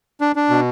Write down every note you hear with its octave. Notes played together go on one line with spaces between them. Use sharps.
D4
D4
B2